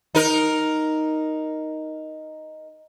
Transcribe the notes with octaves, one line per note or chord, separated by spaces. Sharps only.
D#4 A#4